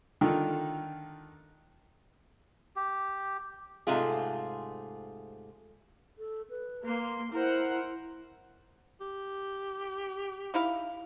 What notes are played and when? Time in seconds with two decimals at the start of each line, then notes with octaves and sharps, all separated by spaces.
0.21 D3 D#3 D#4 F4 A4
2.76 G4
3.87 G#2 C3 A3 F4 G#4
6.18 A4
6.50 B4
6.83 A#3 C6
7.32 E4 A#4 C5 F#5
9.01 G4
10.54 D#4 E4 F5